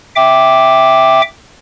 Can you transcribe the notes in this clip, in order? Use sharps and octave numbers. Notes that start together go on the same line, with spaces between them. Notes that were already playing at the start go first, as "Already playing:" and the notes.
E5 G5 D6